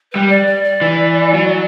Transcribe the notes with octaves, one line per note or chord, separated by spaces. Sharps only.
G3 B4
D5
D5
D5
E3
F#3